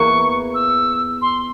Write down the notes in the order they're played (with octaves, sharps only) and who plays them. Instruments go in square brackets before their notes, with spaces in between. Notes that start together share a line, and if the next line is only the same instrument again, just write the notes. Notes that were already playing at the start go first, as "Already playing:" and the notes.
Already playing: [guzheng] E2 E3 A#3 [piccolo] C#6
[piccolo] E6
C6